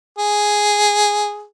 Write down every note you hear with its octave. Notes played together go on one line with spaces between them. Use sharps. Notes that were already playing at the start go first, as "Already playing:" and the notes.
G#4